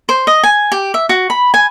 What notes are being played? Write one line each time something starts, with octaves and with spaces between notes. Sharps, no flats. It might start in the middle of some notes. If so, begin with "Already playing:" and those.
C5
D#5
G#5
G4
E5
F#4
B5
G#5